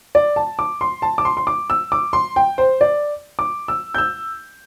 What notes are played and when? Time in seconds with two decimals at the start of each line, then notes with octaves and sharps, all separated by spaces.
0.15 D5
0.36 A5
0.59 D6
0.81 C6
1.02 A5
1.18 D6
1.25 C6
1.37 C6
1.47 D6
1.70 E6
1.92 D6
2.13 C6
2.36 G5
2.58 C5
2.81 D5
3.39 D6
3.68 E6
3.94 G6
3.98 E6